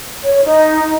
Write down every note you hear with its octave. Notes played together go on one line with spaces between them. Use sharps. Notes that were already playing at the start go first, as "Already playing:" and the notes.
C#5
D#4